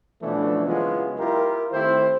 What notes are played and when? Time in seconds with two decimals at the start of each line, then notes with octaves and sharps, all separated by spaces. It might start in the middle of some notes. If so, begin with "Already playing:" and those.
0.22 B2 E3 F3 A3 C#4 D4
0.67 C#3 F#3 G#3 B3 E4 F4
1.18 E4 F4 G4 A#4
1.72 D#3 A3 C4 E4 G4 C5